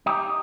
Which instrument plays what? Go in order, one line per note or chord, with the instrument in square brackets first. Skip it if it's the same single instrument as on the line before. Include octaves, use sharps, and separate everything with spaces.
[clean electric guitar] D#4 G4